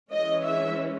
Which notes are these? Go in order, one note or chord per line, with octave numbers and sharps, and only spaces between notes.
E3 G#3 C#4 D#5
E5